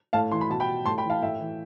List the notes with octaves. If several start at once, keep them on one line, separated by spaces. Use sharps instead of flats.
A2 F5 A5
E3 C6
B5
B2 A5
G5 B5
A2 A5 C6
G5 B5
E3
F5 A5
A2 E5 G5
E3